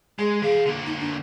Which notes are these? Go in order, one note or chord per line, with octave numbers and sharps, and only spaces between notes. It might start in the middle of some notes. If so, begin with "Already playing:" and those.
G#3 G#4
E3 G#4 F5
D3 A#3
D#4
D4